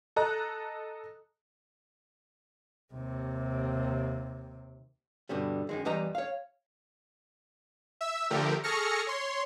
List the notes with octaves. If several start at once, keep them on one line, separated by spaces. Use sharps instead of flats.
A4 D#5 A#5 F#6
D#2 C3
G2 B2 D3 G3
F#2 D#3 G#3
E2 G3 B4 D#5 A#5
C#5 F5
E5 E6
D3 F3 A3 G4 A#4
G#4 A4 C#6 F6 A#6 C#7
C#5 C6